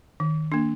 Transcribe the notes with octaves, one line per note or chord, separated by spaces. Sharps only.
D#3
A#3 D4